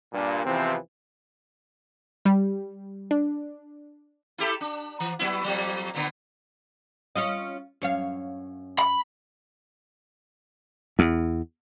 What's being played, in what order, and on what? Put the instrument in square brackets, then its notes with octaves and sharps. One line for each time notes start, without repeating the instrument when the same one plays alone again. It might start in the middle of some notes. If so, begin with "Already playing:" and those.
[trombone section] G2 A#2
E2 C3 E3 F3 C4
[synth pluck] G3
D4
[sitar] E4 G4 A4
D4
E3
F#3 B3 E4
F2 A#2 F#3
A#2 D3 B3
[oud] C#4 F4 D#5
F#2 C#5 F5
[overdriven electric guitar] B5
[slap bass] E2